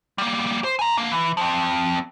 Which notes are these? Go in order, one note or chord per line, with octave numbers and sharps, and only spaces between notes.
G3 A#3
C5
G#5 A#5
D3 A#3
E3
F3 C4